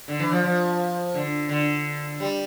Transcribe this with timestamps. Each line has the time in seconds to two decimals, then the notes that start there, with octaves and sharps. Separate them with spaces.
0.08 D3
0.20 E3
0.32 F3
0.43 F3
1.14 D3
1.49 D3
2.20 G3